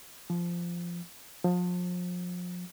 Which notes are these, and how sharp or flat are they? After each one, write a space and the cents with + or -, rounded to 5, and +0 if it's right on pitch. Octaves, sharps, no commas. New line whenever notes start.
F3 -10
F3 +35